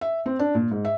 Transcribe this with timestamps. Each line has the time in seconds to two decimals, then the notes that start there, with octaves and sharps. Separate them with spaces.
0.01 E5
0.26 C4
0.39 D4
0.55 A#2
0.71 G#2
0.85 E5